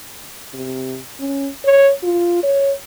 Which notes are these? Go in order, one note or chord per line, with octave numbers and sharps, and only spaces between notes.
C3
C#4
C#5
F4
C#5